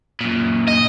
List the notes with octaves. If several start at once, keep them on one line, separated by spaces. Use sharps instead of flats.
F#2 A#2
D#5